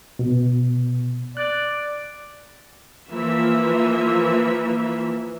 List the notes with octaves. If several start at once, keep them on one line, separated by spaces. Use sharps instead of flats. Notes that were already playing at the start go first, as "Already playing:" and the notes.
B2
D5 F#6
E3 F3 A#3 E5